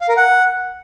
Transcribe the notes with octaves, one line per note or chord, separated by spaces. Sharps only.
F5
A#4
F#5